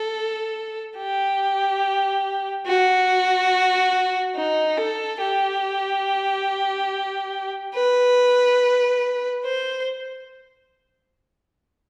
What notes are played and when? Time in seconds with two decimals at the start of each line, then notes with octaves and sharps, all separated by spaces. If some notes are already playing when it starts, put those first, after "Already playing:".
Already playing: A4
0.97 G4
2.66 F#4
4.36 D#4
4.77 A4
5.21 G4
7.75 B4
9.45 C5